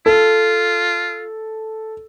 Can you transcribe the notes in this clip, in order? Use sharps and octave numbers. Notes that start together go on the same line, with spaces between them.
F4 A4